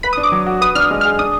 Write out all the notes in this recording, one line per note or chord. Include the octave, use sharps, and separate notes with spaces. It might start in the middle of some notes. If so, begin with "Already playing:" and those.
B4 B5
D#6
D4
D6
F#3
F#4
B4 D#6
D4 F6
G#3
G#4 F6
D4 D#6